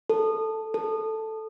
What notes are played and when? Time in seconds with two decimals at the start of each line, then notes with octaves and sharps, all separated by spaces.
0.10 A4
0.74 A4